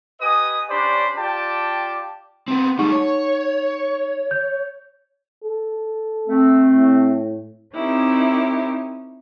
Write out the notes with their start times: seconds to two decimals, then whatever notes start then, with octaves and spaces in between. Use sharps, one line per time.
0.21 G4 B4 D#5 G#5 D#6
0.70 C#4 D4 G4 C5 D5 B5
1.17 F4 G4 D5 G5 A5 D6
2.48 B3 C4
2.79 G3 A3 D#4 F#5 C#6
2.92 C#5
4.31 G6
5.44 A4
6.28 A3 C4
6.74 A2
7.73 C4 C#4 D#4 E4 G4 A#4